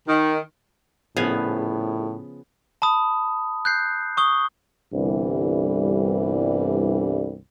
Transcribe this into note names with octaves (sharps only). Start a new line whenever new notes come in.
D#3
A#1 A2 C#3 F3 B3 F5 G#5
A5 B5 D#6
F#6 G6 C7
C#6 D#6 G7
G1 C2 G2 D3 E3 G3